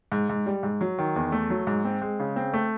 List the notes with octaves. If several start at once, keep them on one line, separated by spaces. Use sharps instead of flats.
G#2
G#2
G3
G#2
F#3
D#3
E2
A3
F#3
G#2
C4
G#3
C#3
C4
A3